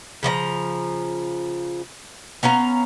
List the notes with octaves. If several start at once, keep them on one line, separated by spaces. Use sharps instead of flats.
C#3 F3 F4 A#5
B3 C#4 F5 A#5